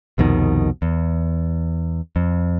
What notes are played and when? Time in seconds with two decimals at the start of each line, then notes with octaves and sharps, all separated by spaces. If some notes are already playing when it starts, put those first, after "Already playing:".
0.18 C2 F2 B2 D#3
0.82 E2
2.16 F2